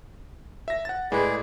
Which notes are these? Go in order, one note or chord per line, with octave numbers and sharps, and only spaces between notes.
E5 A#6
F#5 A6
A2 G#3 G#4 B4 D5